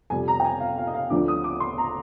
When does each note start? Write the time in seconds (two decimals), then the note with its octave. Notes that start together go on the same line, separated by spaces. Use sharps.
0.10 F2 C3 G3 G#5
0.28 A#5
0.40 G5
0.44 G#5
0.60 F5
0.78 F5
0.87 D#5
0.94 F5
1.10 D2 D3 F3 D6
1.28 D#6
1.44 D6
1.60 C6
1.78 A#5